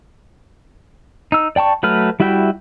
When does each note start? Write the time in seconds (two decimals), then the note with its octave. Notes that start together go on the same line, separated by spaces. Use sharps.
1.32 D#4 E6
1.56 D5 G5 A5 C#6
1.83 F#3 A3 B4 F6
2.20 G3 E4 F#4 E5 G5